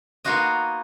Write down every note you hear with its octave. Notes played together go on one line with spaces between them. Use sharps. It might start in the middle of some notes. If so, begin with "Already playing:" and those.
A#3 B3 D#4 F4 F#4 D#5